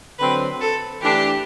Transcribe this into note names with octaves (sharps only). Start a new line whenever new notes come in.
D3 F#3 C4 B4
A4
E3 A3 D4 G4